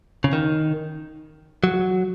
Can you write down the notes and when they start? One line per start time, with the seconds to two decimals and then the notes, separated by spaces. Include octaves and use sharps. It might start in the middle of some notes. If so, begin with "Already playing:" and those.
0.24 C#3
0.33 D#3
1.64 F#3